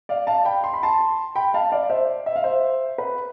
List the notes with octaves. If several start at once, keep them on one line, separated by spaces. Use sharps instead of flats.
D5 F5
F5 A5
G5 B5
C6
B5
A5 C6
G5 B5
F5 A5
D5 F5
C5 E5
E5
F5
C5 E5
B4